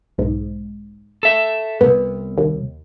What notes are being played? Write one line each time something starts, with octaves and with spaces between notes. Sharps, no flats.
B1 G#2
A4 E5
C2 G2 B3
D#2